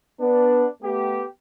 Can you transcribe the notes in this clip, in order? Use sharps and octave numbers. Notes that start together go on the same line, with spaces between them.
B3 D4
A3 B3 G4